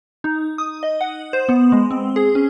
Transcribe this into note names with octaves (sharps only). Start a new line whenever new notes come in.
D#4
D#6
D#5
F#5
C5
B3
G#3
C4
G#4
C#4